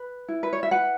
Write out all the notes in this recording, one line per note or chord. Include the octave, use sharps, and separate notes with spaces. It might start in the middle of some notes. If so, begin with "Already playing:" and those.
Already playing: B4
E4
B4
C#5
E5
B4 F#5